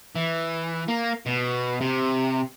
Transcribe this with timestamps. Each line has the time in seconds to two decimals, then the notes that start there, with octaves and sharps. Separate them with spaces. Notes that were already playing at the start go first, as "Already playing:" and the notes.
0.15 E3
0.88 A#3
1.26 B2
1.81 C3